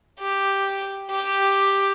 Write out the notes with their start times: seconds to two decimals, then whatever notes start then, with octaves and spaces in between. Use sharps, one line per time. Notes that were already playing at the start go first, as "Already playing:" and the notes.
0.19 G4
1.11 G4